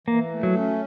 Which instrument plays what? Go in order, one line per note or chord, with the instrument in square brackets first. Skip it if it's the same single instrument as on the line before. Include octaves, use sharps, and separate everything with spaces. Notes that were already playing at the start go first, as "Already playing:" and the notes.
[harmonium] E3 [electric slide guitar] A#3
[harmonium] A3
[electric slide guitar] F#3
[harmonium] C#4